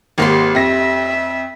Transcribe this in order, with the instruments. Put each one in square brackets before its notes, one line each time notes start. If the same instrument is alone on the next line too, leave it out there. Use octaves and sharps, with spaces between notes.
[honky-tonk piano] G#1 A#3 [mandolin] G4 C#5 C6
[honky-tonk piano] F2 A#6 [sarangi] E5